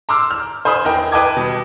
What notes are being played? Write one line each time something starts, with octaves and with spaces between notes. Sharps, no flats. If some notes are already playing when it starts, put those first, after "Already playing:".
A#5 C6 D6 E6 F6
F6
C5 G#5 B5 D#6
E2 D#4 A#4 G5
B4 D#5 G5 A5 D6 G#6
B2 G3